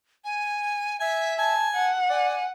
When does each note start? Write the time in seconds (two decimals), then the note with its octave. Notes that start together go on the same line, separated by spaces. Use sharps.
0.24 G#5
1.00 E5 G#5
1.39 G#5 A5
1.75 F#5 A5
2.10 D5 G#5